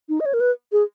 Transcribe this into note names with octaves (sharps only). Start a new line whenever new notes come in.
D#4
D#5
C#5
A#4
B4
G#4